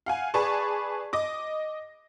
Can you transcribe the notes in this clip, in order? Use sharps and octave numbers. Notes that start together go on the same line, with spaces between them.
F5 F#5 G#5
G#4 B4 D5 A5 C#6
D#5 D6